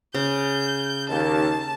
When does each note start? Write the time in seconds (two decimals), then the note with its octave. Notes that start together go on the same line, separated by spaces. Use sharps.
0.14 C#3 G6
1.09 D#2 A5